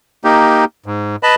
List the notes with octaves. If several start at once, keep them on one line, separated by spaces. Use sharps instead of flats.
A#3 D#4 G4
G#2
B4 D#5 A5 B5